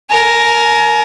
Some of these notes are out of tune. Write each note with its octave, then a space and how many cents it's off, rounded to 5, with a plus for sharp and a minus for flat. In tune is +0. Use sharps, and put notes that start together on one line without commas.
A#4 +0 G#5 +40